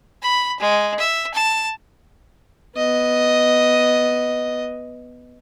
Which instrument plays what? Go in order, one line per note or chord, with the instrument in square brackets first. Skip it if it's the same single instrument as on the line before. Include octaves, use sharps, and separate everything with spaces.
[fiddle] B5
G#3
E5
A5
[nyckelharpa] B3 D#5